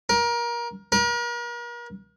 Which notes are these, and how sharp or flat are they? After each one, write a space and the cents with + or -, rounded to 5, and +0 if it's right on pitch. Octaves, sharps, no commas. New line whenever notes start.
A#4 +25
A#4 +40